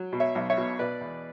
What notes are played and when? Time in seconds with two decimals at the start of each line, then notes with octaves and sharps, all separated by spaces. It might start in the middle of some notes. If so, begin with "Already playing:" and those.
Already playing: F#3
0.13 B2
0.20 C#5 E5
0.35 B1
0.50 C#5 E5
0.57 B2
0.79 B2 B4 D5
1.01 E2